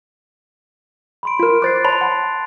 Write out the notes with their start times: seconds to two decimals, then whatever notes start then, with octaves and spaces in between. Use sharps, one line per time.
1.23 B5 C6 D7
1.39 F4 A#4
1.62 C5 D6 F#6 A6 C7
1.85 C#5 A5 B5 C6 F7
2.01 F#5